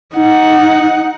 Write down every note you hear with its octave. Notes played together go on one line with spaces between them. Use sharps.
D#4 F#5